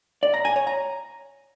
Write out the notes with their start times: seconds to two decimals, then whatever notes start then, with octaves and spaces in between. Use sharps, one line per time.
0.23 D5
0.34 A#5
0.45 G#5
0.56 C#5
0.67 A#5